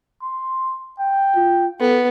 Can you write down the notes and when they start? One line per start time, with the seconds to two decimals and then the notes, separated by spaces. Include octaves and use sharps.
0.22 C6
0.99 G5
1.36 F4
1.81 B3 A4